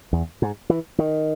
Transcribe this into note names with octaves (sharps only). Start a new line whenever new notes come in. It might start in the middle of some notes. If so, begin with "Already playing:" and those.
E2
G#2
E3
D#3